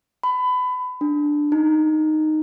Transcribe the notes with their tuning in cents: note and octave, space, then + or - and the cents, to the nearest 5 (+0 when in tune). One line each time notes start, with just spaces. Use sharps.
B5 +25
D4 +5
D#4 -10